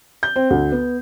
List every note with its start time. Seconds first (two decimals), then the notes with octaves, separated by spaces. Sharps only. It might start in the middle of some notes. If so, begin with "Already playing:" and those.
0.23 G6
0.36 C4
0.50 D2
0.72 B3